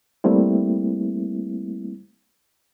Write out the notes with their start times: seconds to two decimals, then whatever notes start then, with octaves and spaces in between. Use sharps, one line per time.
0.24 G3 A3 A#3 C4 E4